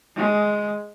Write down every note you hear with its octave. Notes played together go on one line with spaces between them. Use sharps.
G#3